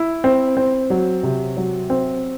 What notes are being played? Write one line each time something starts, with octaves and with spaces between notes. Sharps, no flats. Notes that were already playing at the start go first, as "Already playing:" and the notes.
Already playing: E4
C4
C4
F#3
C3
F#3
C4